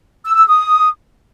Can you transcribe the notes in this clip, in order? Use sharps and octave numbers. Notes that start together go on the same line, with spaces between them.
E6
E6
D#6